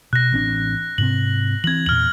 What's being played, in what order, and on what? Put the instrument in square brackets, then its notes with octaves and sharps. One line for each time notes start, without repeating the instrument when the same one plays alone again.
[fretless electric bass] B2 [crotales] F#6 A#6
[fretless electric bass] A1 C4 D4
[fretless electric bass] G#2 C3 C4 [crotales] F#7
[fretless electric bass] E3 C4 [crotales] G#6 F#7
[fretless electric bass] E2 A#2 [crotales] F6 F#7